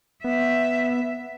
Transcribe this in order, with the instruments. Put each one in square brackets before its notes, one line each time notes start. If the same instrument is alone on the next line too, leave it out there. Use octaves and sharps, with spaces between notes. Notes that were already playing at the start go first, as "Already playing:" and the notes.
[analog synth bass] B3 [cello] E5